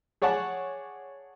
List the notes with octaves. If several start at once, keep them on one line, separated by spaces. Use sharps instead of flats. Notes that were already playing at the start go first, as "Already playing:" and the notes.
G#4 C#5 D5 F#5 A5